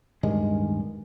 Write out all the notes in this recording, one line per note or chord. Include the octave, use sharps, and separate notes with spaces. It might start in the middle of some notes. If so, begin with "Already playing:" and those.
D1 G2 D#3 G#3